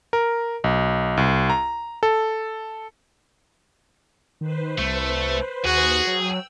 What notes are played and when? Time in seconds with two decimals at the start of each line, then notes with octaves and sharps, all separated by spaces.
0.13 A#4
0.64 B1
1.17 C2
1.50 A#5
2.03 A4
4.41 D#3 B4 C5
4.79 C2 A3
5.65 D#2 F#4 G#4
6.07 F#3 G5 E6